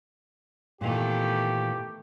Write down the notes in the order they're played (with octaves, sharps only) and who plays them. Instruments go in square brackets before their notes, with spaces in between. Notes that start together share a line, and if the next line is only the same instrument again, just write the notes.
[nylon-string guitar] A#2 E3 [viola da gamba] D#3 A3 B3 [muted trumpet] G4